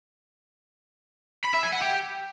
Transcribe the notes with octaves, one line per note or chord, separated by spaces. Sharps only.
B5
E5
G#5
F#5
G4